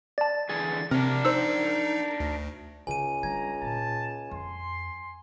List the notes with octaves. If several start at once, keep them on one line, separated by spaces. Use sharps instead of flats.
D5 A5 A6
D3 E3 G#4 A6
C3 C4 D4 A#4
D#4 C5 E6
D2
C#2 C#3 D#4 G#5 D#7
G3 D4 A#5 G#6
A#2 G#3 A5
F2 C6